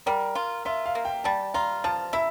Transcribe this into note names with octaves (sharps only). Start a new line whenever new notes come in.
G3 A#4
F4
F4 E5
F5
A#3
G5
G3 A5
F4 A#5
F3 A5
E4 E5